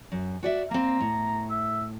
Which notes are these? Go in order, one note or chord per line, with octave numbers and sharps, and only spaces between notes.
F#2
F#4 D5 E5
A#3 C4 A#5
A2
E5